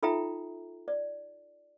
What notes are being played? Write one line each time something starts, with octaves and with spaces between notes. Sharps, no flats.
D#4 F4 A4 E5 G5 A#5
D5